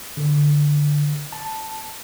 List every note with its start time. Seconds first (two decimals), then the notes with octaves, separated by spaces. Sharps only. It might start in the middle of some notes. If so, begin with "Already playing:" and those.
0.17 D3
1.32 A5